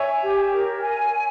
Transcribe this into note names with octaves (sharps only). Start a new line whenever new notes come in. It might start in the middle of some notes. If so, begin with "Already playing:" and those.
Already playing: C#5 E5 G#5
G4
A#4
G#5